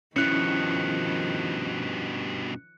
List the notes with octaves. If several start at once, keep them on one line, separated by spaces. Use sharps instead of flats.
G2 B2 D#3 F3 C#4 E4 F#6 C#7